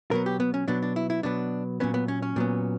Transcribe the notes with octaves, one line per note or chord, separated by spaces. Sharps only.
B2 F#3 B3 A#4
G4
B3
C#4
B2 F#3 B3 D4
D4
E4
E4
B2 F#3 B3 D4
A#2 F#3 B3 C#4
B3
C#4
C#4
A#2 F#3 B3